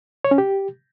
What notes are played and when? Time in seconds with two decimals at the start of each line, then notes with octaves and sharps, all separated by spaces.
0.25 C#5
0.31 C#4
0.38 G4